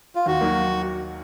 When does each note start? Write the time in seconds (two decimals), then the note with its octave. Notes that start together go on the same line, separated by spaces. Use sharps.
0.15 F4
0.26 D#2 F#4
0.41 D#3 F#3 A#3